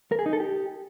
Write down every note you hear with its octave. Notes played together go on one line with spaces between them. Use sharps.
A#4
G#4
D#4
A4
G4